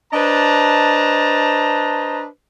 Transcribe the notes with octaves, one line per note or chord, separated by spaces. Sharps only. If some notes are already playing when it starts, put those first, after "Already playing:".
D4 B4 C5 D#5 A5 A#5